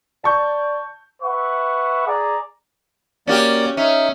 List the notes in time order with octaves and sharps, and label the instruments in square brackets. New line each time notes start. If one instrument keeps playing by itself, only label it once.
[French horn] D5 [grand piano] A5 C#6 G6
[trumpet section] B4 E5 F#5 C#6
G#4 D5 A#5 D6
[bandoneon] A#3 D5 [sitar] C#4 F#4 G4
[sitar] C#4 [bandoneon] D#4 E5